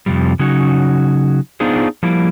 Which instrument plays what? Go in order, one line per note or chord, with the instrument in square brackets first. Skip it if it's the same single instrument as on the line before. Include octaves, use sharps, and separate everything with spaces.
[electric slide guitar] F2 G#2 C3 F3 G3
C#3 F#3 C#4 D#4 F#4
B3 D4 D#4 F4 G#4 C5
F3 G3 A#3 E4